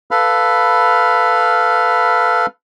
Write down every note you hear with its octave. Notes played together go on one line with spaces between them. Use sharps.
A4 B4 F5 B5 F6